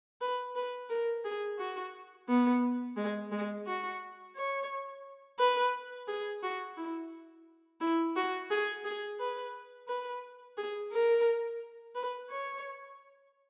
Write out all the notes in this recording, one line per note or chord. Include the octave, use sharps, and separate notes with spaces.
B4
B4
A#4
G#4
F#4
B3
G#3
G#3
F#4
C#5
B4
G#4
F#4
E4
E4
F#4
G#4
G#4
B4
B4
G#4
A#4
B4
C#5